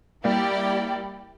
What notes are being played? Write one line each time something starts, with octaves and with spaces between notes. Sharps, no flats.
G3 A#3 E4 G4 D5 G5